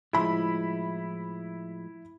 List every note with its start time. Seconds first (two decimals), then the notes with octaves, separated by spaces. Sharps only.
0.13 A2 F3 G#3 E4 B5